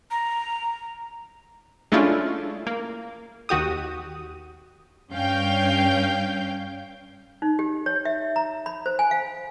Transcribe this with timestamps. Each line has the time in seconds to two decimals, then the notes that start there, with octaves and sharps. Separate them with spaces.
0.11 A#5
1.92 G#3 A3 C#4 D4 E4 F4
2.67 A#3
3.49 D#2 F#4 G4 D#6
5.13 G2 C#4 F5 G5 G6
7.42 D#4
7.59 G4
7.86 C#5
8.05 E5
8.36 A#5
8.66 B5
8.86 C5
8.99 G#5
9.11 F5